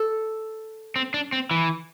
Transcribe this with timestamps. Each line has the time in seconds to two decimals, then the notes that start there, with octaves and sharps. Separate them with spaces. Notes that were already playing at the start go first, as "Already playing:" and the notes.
Already playing: A4
0.96 C4
1.14 D4
1.32 C4
1.51 E3